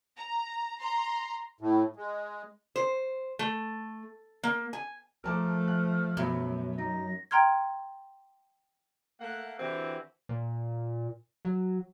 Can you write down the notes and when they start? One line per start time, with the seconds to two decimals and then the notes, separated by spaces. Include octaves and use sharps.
0.16 A#5
0.80 A#5 C6
1.61 A2
1.96 G#3
2.76 C5
3.39 A3
4.43 A#3
4.73 G#5
5.24 F3 A3 A#4 A5 D6 F6
5.68 F#6
6.17 F#2 B2 E5 B5
6.78 D#4 A#6
7.31 G5 A#5 C6 F6 G#6
9.21 A3 A#3 F#5
9.59 D3 E3 C4 E4 F#4 G4
10.29 A#2
11.45 F#3